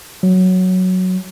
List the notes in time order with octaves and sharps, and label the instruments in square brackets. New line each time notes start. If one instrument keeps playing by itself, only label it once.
[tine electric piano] F#3